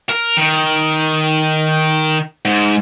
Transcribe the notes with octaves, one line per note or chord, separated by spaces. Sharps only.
A#4
D#3
G#2